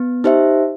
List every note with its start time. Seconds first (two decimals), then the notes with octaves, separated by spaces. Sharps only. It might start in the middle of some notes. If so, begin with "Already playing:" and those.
Already playing: B3
0.24 D#4 G4 C5 E5